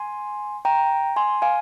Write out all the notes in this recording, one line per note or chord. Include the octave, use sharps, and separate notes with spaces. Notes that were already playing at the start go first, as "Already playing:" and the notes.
Already playing: G#5 C6
G5 A#5
G#5 C6
F5 G#5